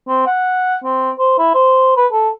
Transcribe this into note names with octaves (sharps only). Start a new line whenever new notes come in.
C4
F#5
C4
C5
E4
C5
B4
A4